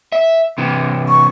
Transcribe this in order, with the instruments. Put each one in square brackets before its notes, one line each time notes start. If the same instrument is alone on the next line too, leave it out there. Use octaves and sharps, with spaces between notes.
[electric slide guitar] E5
C3 E3
[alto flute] C#6